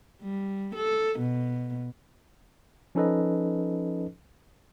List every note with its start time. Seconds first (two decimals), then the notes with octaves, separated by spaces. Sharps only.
0.22 G3
0.75 A4
1.19 B2
2.95 F3 C#4 D#4 A4 B4 D#5